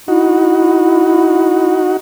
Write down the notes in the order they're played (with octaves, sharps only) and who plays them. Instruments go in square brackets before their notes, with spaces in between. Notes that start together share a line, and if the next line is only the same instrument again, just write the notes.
[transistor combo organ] D#4 F#4 [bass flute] E4